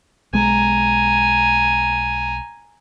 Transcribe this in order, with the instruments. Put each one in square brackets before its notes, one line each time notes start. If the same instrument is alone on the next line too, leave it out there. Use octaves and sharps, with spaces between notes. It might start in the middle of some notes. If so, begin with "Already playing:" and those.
[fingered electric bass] B1 G#3 [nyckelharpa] G#5 A#5